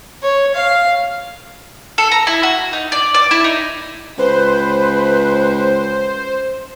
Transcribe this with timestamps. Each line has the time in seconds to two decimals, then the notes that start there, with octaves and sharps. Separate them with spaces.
0.22 C#5
0.55 F5
1.98 A4
2.12 A#5
2.27 E4
2.43 F#4
2.73 D#4
2.92 D5
3.14 D5
3.31 E4
3.44 D#4
4.18 C#2 B4 C5